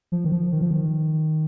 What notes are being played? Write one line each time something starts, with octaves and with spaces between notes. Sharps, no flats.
F3
D#3
F3
D#3
F3
D#3